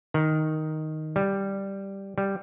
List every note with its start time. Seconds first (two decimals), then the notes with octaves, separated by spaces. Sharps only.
0.14 D#3
1.16 G3
2.18 G3